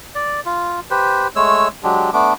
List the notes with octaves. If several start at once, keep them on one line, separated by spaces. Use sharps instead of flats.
D5
F4
G4 B4 C5
G#3 A3 C#5 E6
F#3 G#3 D4 G4
A3 B3 D4 D6